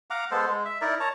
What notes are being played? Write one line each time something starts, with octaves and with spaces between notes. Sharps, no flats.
F5 F#5 A#5 D6
G#3 B3 A4 C5
G#3
E5
D#4 E4 A#4 D5
C#5 A5 A#5